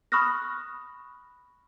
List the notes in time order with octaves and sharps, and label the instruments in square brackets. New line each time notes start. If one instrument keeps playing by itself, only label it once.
[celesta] B5 C#6 D#6 F6 F#6 A#6